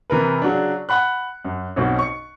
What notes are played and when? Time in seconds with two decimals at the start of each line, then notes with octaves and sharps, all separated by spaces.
0.10 C3 E3 A#4 B4
0.42 C#3 F#3 D4
0.89 F#5 B5 F#6
1.45 F#2
1.76 B1 B2 C4 C#4 F#4
1.99 C#6 C#7